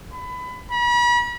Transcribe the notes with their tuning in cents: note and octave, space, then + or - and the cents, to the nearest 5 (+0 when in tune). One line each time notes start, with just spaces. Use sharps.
B5 +25
B5 -40